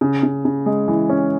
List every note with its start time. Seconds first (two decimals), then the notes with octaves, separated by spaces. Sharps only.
0.01 C#3
0.23 C#3
0.45 C#3
0.66 G#3
0.88 E3
1.09 C#4